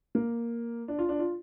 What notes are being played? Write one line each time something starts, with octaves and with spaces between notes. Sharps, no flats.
A#3
D4
F4
D4
F4